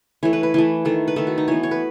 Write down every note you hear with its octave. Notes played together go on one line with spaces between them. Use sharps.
E3 A3 C#5
B4
B4
E3 A3
D#3 A3
B4
D#3 A3 A4
F#4
D#4
E3 B3 C#5
C#5
B4